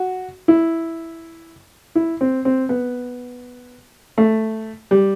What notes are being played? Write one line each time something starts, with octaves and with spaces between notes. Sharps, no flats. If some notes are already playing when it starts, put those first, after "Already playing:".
Already playing: F#4
E4
E4
C4
C4
B3
A3
G3